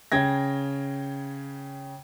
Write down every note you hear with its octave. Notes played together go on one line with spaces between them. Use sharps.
C#3 G5 G#6 A#6